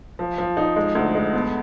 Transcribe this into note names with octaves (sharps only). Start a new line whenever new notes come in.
F3
F3
D#4
G#3
D2
G#3
B3